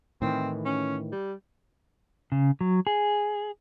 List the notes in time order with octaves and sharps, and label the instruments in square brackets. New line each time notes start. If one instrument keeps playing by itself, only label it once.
[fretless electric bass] A2 D#3 E3 [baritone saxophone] C4
[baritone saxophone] C#4
G3
[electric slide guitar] C#3
F#3
G#4